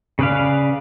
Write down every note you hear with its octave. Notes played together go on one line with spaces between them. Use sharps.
C#3 G#4 B4 D5 F5